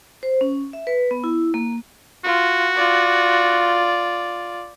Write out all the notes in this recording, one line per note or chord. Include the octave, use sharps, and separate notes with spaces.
C5
C#4
E5
B4
B3
E4
A#3
F4 F#4
F4 D5